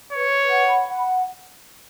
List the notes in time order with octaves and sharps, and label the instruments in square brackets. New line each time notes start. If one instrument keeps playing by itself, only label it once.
[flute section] B4 [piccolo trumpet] C#5
[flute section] B4
F#5
B5
F#5